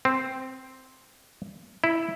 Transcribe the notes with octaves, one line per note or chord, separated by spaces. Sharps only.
C4
E4